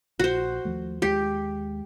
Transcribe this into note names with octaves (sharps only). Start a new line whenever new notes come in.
A#1 F#4 C5
D#2 F3 A3
D#2 G#3 G4